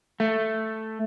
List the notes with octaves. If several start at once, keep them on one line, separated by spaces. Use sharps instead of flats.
A3